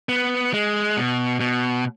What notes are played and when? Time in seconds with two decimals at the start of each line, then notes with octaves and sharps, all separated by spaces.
0.09 B3
0.53 G#3
0.97 B2
1.40 B2